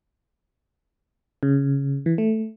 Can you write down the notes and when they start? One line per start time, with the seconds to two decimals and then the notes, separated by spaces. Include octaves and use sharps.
1.43 C#3
2.06 E3
2.18 A3